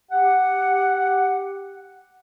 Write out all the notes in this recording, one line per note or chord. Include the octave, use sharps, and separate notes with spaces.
G4 F#5